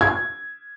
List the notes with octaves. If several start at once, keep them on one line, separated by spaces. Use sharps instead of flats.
G#6